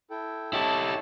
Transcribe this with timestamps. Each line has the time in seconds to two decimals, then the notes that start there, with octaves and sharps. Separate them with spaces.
0.10 E4 A4 G5
0.53 E4 G4 A4 C#5 D#5 A5